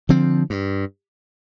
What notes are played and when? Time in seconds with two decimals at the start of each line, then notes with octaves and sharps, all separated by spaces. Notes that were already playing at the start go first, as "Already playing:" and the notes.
0.09 D3 F3 C4
0.50 G2